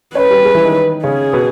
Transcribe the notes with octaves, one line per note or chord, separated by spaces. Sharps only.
C#4 B4 C#5
G3 G4
G#3 G#4
E3 E4
D#3 D#4
C#3 C#4 G#4
B2 B3